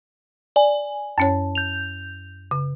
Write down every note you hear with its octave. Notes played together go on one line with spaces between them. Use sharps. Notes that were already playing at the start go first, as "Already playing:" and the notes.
D5 G#5
F#2 C#4 C#5 A5
G6 F7
C#3